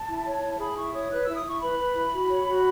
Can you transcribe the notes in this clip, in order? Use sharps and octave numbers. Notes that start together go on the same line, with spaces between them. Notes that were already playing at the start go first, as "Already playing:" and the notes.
Already playing: A5
E4
C#5
E4
G#4 B5
E4 C#6
C#5 D#6
B4 F#6
E4 E6
D#6
E4 C#6
B4 B5
B4
E4
F#4
C#5
F#4